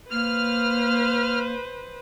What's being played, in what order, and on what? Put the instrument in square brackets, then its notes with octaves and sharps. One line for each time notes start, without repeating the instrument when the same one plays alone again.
[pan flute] A#3 [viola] B4 C5 [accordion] F6